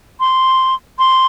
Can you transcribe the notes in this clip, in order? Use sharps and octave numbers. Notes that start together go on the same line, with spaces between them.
C6
C6